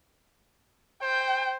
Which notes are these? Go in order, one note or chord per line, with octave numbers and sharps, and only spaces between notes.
C5 G5